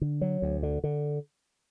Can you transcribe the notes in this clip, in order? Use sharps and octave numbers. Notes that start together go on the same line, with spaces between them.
D3
F#3
D2
D3
D3